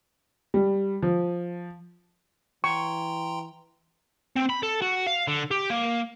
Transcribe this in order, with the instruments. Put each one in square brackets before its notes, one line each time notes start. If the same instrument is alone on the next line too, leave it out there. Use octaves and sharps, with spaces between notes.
[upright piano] G3
F3
[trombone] E3 [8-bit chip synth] G5 A#5 C6 [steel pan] C#6
[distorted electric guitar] C4
B5
A4
F#4
F5
D3
G4
A#3